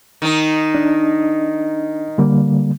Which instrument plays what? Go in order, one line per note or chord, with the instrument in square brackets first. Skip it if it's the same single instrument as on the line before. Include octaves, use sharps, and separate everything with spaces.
[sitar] D#3 D#4
[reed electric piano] D4
D3 G3 A#3